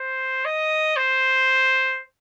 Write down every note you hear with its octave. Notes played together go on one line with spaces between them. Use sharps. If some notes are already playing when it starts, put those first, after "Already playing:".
Already playing: C5
D#5
C5